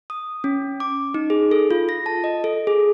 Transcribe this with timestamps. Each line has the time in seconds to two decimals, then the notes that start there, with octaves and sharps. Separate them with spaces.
0.10 D#6
0.44 C#4
0.80 D6
1.14 D#4
1.30 G#4
1.51 A4
1.71 F4
1.89 A#6
2.06 A5
2.24 D#5
2.44 A4
2.67 G#4